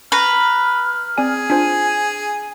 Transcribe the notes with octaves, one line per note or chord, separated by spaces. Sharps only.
B4 A#5 C#6 F6
C4 G#4 D5 G#5
D4 F4 C5 G#5